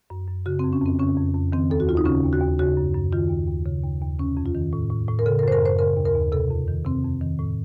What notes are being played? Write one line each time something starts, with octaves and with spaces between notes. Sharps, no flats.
F#2
F#2
C#3 F#4
C4
F2
C#4
F2 C4
C#3 C#4
F2
F2
D#3 C4
D#2 A4
F#4
D#2 F4
D#4
C#3 C#4
D#2
F#4
D#2
C#3 F#4
F#2
F#2
D#3 F4
D#2
D#2
C#3
D#2
D#2
C3 C#4
F2
F4
D#3
A2
A2
A2
A#4
C#3 A4
A#4
F#2 C5
A#4
F#2 C5
C#3 A#4
D#2
A#4
D#2
C3 A4
F2
D#3
C3 C4
F2
D#3
A2